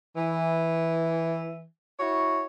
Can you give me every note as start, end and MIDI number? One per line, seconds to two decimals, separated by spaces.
0.17 1.66 52
1.99 2.46 64
1.99 2.46 66
1.99 2.46 73